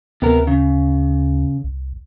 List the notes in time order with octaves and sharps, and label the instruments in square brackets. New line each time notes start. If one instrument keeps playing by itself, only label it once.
[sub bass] D2 [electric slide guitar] C3 B3 A#4
[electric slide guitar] C#3
[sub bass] C2